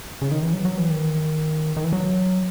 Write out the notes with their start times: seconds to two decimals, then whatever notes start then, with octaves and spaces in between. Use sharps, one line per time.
0.22 C#3
0.31 D#3
0.43 E3
0.53 F#3
0.65 F#3
0.78 E3
0.91 D#3
1.77 D#3
1.84 E3
1.93 F#3